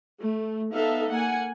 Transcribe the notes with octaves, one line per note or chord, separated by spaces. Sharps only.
A3
B3 D#4 A4 E5 F5
A#3 F#5 G#5